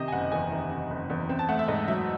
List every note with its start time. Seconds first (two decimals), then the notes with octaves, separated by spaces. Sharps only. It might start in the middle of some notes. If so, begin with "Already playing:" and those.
Already playing: C3 D#3 D#5
0.08 G#5
0.12 F#1 F#5
0.32 E2 G#5
0.51 D#3
0.71 C3
0.90 F#1
1.10 E2
1.29 C4
1.39 A5
1.49 A3 F#5
1.59 E5
1.68 G#2 D#5
1.88 F#3 E5